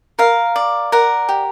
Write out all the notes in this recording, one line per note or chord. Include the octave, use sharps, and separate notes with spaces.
A#4 F5
D5
A#4 F#5
G4